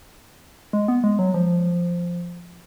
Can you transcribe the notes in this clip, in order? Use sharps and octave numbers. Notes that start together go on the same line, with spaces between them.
G#3
B3
G#3
F#3
F3